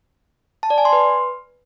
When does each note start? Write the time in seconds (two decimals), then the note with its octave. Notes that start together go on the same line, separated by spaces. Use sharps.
0.63 A5
0.70 D5
0.78 G#5
0.85 C6
0.93 B4